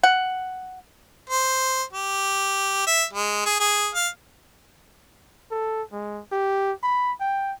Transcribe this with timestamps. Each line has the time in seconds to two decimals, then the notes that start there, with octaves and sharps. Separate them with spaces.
0.03 F#5
1.30 C5
1.93 G4
2.87 E5
3.13 G#3
3.46 G#4
3.60 G#4
3.95 F5
5.51 A4
5.93 G#3
6.32 G4
6.83 B5
7.21 G5